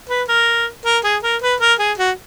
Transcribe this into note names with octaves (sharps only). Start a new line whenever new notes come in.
B4
A#4
A#4
G#4
A#4
B4
A#4
G#4
F#4